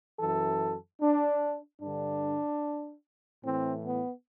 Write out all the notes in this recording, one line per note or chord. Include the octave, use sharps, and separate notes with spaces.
F#2 E3 A4
D4
G2 D3 D4
A2 E3 C4
B3